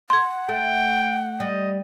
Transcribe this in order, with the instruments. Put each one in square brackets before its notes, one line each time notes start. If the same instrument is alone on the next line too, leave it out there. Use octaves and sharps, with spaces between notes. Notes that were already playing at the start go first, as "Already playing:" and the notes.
[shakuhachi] F#5 [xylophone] C6 G#6
[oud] A3 [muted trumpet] G5
[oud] G3 [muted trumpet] D#5